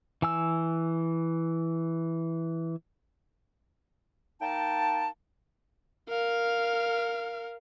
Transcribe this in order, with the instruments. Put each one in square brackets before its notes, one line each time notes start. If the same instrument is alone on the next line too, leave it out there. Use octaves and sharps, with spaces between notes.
[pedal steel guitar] E3 G#5 E6
[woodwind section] A#3 D#4 G5 A5
[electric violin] A#4 F5